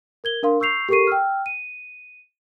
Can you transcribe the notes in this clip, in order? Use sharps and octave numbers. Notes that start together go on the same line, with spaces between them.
A#4 G#6 G7
D4 A#4 F5 C6
C#6 E6 G6 C7 F7
G4 A4 A#4 C#6 C7 D#7
G5 E6 F6
D#7